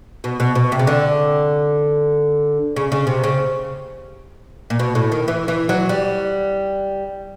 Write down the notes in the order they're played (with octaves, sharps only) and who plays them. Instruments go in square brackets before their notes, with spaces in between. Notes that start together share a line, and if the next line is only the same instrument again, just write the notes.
[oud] B2
B2
B2
C3
C#3
D3
C#3
C#3
C3
C#3
A#2
B2
A2
D#3
E3
E3
F#3
G3